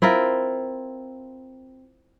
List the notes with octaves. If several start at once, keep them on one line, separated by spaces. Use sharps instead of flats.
C4 E4 F4 A#4